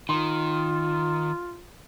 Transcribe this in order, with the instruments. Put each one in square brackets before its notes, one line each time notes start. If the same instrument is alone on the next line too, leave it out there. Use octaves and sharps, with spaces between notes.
[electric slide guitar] D#3 [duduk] F4 [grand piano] C6